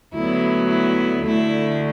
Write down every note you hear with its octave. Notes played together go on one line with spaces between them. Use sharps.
D2 D3 F#3 B3 E4
E4
D2 D3 A3 E4